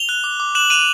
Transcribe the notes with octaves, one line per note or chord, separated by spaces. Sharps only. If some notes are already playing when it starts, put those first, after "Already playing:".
Already playing: F7 G7
F#6
D6
D6
F#6 E7 F#7
F#6 D#7 F7